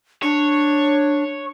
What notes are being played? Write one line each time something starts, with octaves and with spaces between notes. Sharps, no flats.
D4 C#5